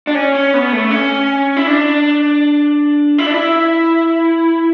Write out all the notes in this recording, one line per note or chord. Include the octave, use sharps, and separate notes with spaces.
D4
C#4
C#4
B3
A3
C#4
E4
D4
E4
D4
E4